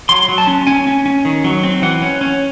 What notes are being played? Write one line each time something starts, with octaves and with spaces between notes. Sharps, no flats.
F#3 C6
F#3
A5
C#4
C#4 G#5
C#4
C#4
D#3
F#3
C4
E3 F#5
C#4
C#4